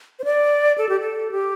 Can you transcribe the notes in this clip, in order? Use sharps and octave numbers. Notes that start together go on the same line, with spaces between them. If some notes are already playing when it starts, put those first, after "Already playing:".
C5
D5
A4
G4
A4
G4